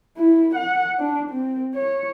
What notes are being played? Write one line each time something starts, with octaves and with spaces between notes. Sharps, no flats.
E4
F#5
D4
C4
C#5